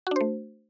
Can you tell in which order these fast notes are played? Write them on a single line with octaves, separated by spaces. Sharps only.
F#4 D4 C5 A3